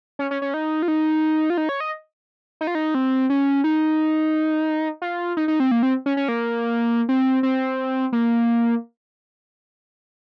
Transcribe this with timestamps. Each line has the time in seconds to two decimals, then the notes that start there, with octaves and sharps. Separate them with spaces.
0.19 C#4
0.31 C#4
0.42 C#4
0.54 D#4
0.82 F4
0.88 D#4
1.50 F4
1.58 D#4
1.69 C#5
1.80 D#5
2.61 D#4
2.67 F4
2.75 D#4
2.95 C4
3.30 C#4
3.64 D#4
5.02 F4
5.37 D#4
5.48 D#4
5.60 C4
5.71 A#3
5.83 C4
6.06 C#4
6.17 C#4
6.28 A#3
7.09 C4
7.43 C4
8.13 A#3